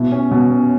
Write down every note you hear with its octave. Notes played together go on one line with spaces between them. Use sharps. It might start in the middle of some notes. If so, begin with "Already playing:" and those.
Already playing: B2 E4
C#4
B2
C#4